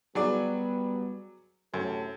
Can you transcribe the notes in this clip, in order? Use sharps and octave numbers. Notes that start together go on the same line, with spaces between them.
F#3 G3 B3 G#4 D5
F#2 A2 C3 A4